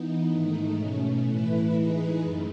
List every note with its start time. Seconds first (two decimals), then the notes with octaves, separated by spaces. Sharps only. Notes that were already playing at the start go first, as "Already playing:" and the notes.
Already playing: E3 B3 D#4
0.29 G#2 D#3 A3 D#4
0.76 B2 A3 C#4
1.25 A2 E3 A3 E4 B4
1.73 E3 G#3 D#4 G#4 B4
2.21 F#2 D#3 A3